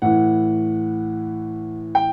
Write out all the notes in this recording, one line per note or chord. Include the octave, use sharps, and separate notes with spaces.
A2 E3 F#5
G5